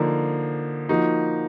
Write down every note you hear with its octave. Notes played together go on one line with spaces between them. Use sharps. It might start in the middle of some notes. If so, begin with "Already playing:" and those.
Already playing: D3 F3 A#3 D#4
F3 A#3 D#4 F#4